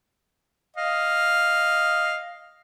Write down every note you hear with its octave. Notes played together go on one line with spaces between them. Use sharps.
D#5 F5